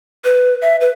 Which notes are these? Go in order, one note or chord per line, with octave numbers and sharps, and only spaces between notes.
B4
E5
B4